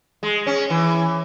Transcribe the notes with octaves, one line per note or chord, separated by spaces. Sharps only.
G#3
C#4
E3